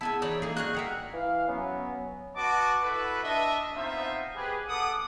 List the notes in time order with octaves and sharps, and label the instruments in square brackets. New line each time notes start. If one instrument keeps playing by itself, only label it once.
[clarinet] B3 [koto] E4 G#5 [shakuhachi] G#4 [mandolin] A5 E6
[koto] E3 D#4 [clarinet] C#5 [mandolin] D5
[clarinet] A#3 [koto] D#4 G#4 [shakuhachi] A4
[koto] F#4 G#4 [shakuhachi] D5 [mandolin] F6 F#6
[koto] G#4 A#4 E5 [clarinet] F#5 [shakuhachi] G5
[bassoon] E3 [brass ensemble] F5
[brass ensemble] F#3 B3 [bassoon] C#4
[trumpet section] F#4 B4 D#5 A5 D6
E4 F#4 A4 B4
D4 D#5 E5
B3 C4 D#4 F4 C5 E5
G4 G#4 B4
B3 A4 F#5 D6 D#6